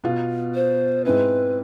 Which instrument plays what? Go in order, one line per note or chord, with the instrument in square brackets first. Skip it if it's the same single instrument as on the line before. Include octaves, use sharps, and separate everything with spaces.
[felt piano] B2 B3 F4
[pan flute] C5
[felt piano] G#2 G#3 C4 E4 [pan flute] B4